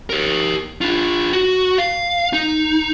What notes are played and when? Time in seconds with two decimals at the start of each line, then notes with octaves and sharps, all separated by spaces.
0.10 G4 A#4
0.81 D4 F4
1.33 F#4
1.78 F5
2.33 D#4